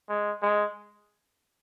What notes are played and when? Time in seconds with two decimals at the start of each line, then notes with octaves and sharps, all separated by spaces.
0.09 G#3
0.42 G#3